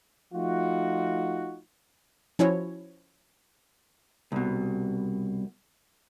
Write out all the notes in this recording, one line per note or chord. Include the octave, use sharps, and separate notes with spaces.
F3 A3 D#4 F4 F#4
F3 C#4 E4 F#4 C#5
C2 B2